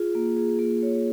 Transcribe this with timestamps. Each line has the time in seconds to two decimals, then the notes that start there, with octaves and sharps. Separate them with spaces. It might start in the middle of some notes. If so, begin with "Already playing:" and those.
Already playing: F4 G#4
0.15 A#3
0.37 G#4
0.59 A#3
0.83 C#5